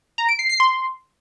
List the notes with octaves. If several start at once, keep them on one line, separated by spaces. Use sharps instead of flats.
A#5
D7
C7
C7
C6